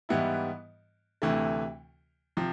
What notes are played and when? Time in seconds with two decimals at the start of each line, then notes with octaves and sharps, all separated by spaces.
0.09 G#2 E3 G3 B3 E4
1.22 D2 C3 E3 A3
2.37 C3 F3